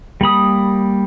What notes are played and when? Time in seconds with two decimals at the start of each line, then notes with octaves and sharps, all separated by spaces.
0.21 G3 A#3 B5 D#6